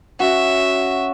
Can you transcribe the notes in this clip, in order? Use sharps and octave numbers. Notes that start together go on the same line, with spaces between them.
C#4 F#4 E5